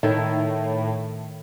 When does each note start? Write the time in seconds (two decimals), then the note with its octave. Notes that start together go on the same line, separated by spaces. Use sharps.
0.03 A2 D#3 E4